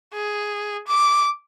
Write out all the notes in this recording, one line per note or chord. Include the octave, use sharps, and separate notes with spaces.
G#4
D6